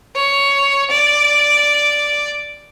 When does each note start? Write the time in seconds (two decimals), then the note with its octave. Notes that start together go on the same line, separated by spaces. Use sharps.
0.15 C#5
0.90 D5